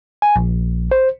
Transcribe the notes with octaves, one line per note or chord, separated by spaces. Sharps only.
G#5
A#1
C5